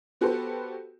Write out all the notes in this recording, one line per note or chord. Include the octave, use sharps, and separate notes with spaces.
B3 F#4 G4 A4 B4 C5